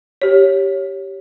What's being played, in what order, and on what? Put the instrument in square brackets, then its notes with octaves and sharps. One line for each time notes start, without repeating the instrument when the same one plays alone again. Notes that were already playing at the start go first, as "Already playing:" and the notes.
[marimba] G4 C#5